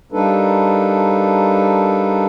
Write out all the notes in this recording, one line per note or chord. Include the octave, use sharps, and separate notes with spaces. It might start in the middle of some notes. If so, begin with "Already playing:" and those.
G3 A#3 D4 D#4 A4 B4